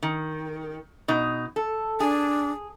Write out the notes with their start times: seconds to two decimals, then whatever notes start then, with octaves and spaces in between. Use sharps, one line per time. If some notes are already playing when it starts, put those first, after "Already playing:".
0.03 D#3
1.08 B2 D#4
1.56 A4
2.00 D4 G#4